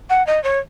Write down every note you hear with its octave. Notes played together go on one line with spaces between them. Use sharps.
F#5
D#5
C#5